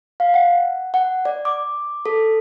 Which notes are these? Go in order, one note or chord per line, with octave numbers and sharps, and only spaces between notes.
F5
F#5
F#5
D5
D6
A4